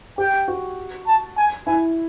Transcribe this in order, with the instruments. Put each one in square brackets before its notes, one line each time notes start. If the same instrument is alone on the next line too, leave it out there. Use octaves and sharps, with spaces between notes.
[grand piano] G4 [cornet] G5
[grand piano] F#4
[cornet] A5
G#5
[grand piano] E4 [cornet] G#5